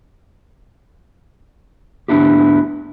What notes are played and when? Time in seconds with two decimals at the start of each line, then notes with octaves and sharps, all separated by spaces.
2.08 D2 G#2 B3 D4 E4 G4